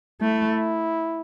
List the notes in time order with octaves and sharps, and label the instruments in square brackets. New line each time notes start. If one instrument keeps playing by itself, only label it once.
[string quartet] A3 [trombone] E4